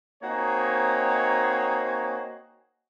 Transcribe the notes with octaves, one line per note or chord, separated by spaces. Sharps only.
A#3 C4 D#4 F#4 G#4 C#5